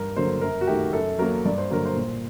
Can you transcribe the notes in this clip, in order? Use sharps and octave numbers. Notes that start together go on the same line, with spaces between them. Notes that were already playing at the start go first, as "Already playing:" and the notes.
Already playing: G2 A#4
D3 F#3 A#3 C5
F#2 A#4
F#4
D#3 A3 G4
F#2 A4
F#3 A#3 A#4
G2 D5
C5
D3 F#3 A#3 A#4
C5
A#2